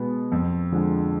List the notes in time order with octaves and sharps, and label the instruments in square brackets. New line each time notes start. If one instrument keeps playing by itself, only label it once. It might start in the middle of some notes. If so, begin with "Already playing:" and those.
Already playing: [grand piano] B2 G#3 B3
F2
D3 F3 G#3